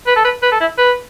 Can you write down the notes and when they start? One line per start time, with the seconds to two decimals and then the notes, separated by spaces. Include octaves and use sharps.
0.07 B4
0.16 A4
0.25 B4
0.42 B4
0.52 A4
0.61 E4
0.78 B4